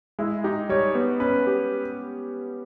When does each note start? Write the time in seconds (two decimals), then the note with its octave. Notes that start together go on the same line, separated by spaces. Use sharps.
0.19 G#3 E4
0.44 D#4 G4
0.69 G3 C#5
0.95 B3
1.20 C#4 B4
1.47 G4